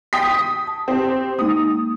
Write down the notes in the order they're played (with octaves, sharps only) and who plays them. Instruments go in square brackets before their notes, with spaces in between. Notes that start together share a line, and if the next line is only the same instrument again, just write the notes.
[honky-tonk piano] G5 D#6 B6
D#6
[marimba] A5
[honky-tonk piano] C4 G4
[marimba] G#3 A#3 D#4 [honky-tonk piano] D#6